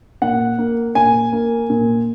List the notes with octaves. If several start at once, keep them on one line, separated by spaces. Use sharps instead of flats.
A#2 F#5
A#3
A#2 G#5
A#3
A#2